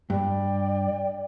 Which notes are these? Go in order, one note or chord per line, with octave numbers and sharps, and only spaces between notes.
G2 D5 G5